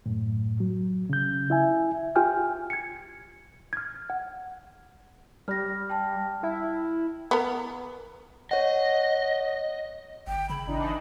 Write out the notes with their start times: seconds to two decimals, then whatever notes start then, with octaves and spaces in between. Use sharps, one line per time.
0.06 F#2 A2
0.60 F#3
1.10 C#3 G6
1.50 E4 E5 G#5
2.15 F4 G4 G5 G#5 F6 G6
2.70 G#6 C#7
3.73 F6 G#6
4.10 F#5
5.48 G3 F6 A#6
5.89 G5 A5 F6
6.43 E4
7.31 B3 A#4
8.51 C#5 D#5 F#5
10.27 G1 G5
10.50 C#3 B5
10.67 G#1 E3 D4 D#4